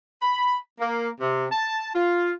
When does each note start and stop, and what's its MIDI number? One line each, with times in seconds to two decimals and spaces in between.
0.22 0.57 83
0.80 1.08 58
1.20 1.46 48
1.52 1.90 81
1.93 2.31 65